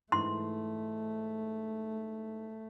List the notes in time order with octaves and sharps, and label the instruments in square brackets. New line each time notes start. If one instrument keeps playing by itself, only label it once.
[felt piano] G#2 E3 [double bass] A3 [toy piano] C6